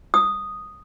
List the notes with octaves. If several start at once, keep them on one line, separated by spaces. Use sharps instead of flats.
D#6